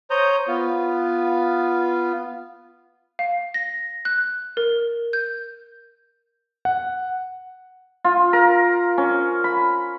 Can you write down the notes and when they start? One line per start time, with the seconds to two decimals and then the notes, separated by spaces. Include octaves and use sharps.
0.10 C5 C#5 A#5 D#6 G6
0.48 B3 F4
3.19 F5
3.54 A#6
4.05 F#6
4.57 A#4
5.13 G6
6.65 F#5
8.04 F4
8.33 A#4
8.98 C#4
9.44 B5